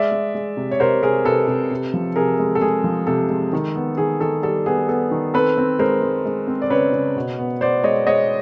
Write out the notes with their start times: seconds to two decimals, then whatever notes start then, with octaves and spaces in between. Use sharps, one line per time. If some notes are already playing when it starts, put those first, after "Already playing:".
Already playing: G#3 D5 E5
0.12 G#3
0.35 G#3
0.57 C3
0.71 C#5
0.80 C3 A#4 C5
1.02 C3 G#4 A#4
1.25 C3 A4 B4
1.48 C3
1.71 C3
1.94 F3
2.16 C3 G#4 A#4
2.39 G#3
2.55 A4
2.61 G#3 G#4
2.84 F3
3.07 C3 A4
3.30 G#3
3.53 D#3
3.75 B3
3.97 D#3 G#4
4.21 D#3 A4
4.43 G3 A4
4.66 B3 G#4
4.88 B3 A4
5.11 D#3
5.34 C4 A4 B4
5.58 C4
5.79 G#3 A#4 C5
6.02 G#3
6.25 G#3
6.47 C4
6.62 D5
6.70 C#3 B4 C#5
6.93 C#3
7.16 B2
7.39 B3
7.61 B3 C5 D5
7.83 G#3 C#5 D#5
8.07 G#3 C#5 D#5